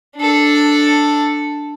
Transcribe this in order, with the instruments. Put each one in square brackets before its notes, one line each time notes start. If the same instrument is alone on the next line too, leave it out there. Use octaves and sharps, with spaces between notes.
[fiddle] D4 A4